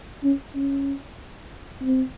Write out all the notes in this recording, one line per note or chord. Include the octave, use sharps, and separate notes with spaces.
C#4
C#4
C4